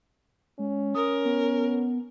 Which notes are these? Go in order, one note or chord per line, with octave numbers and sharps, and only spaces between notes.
G#3 C#4
A#4 D#6
B3